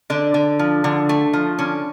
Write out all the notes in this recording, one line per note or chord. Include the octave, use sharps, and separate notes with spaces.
D3 D4
D3
F3
D3
A3
F3
D3 C#4